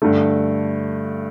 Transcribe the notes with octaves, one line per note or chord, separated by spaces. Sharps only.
G2 D3 A3